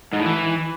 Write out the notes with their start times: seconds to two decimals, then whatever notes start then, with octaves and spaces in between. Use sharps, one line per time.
0.13 G#2
0.19 A2
0.25 E3